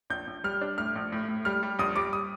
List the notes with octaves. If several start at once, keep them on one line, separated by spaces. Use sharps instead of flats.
A#1 G6
A#1
G3 F6
D4
A2 F6
A#1
A2
A2
G3 F6
G3
A#1 D#6
G3 D6
D#6